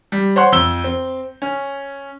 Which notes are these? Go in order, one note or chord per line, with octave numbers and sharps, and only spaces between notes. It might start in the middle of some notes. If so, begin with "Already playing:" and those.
G3
C5 C#5 F#5 C6
F2 E6 G7
C4
C#4